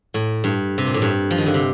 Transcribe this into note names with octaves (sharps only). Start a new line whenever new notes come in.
A2
G2
C3
A#2
A2
G2
F3
D#3
D3
C3